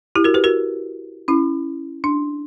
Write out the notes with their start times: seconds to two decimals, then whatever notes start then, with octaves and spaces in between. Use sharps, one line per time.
0.15 E4 G4
0.24 F#4 A#4
0.34 G4 B4
0.44 F#4 A#4
1.28 C#4 E4
2.04 D4